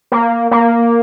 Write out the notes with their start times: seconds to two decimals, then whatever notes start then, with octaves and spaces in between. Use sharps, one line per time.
0.12 A#3
0.51 A#3